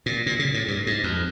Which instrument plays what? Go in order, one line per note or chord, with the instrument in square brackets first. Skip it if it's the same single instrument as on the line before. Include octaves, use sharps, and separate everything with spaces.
[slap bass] A#2
A#2
C#3
A2
G2
G#2
F2